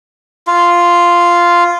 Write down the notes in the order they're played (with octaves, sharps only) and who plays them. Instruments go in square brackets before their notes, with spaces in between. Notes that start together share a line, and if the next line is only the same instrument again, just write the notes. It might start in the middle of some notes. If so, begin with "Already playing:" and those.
[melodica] F4